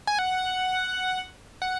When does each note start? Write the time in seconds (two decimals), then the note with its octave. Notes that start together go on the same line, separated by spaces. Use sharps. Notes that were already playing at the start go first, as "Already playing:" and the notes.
0.07 G#5
0.19 F#5
1.62 F#5